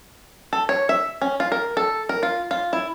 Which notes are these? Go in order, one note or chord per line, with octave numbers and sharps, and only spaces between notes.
A4
C#5
E5
C#4
F4
A#4
A4
A#4
F4
F4
E4